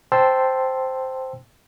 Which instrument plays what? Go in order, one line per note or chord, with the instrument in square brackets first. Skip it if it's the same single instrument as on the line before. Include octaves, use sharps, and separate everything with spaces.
[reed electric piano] C5 G5 A5 C6 E6